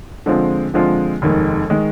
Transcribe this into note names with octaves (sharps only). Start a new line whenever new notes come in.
D3 F3 G#3 C4 F4
D3 F3 G#3 C4 F4
F1 D#2 D#3 G#3
D#3 G#3